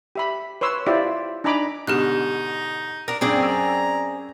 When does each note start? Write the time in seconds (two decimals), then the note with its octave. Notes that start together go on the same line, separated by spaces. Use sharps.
0.15 G4 E5 B5
0.61 B4 C#5 C6 E6
0.86 E4 F4 G4 C5 D5 E5
1.44 D4 D#4 G#5 A#5 B5 D6
1.87 G#2 B2 D3 D#4 G4 F6 F#6
3.08 D4 A#4
3.21 F#2 A#2 C4 D4 G#4 D5
3.39 F#2 G#5 A#5 E6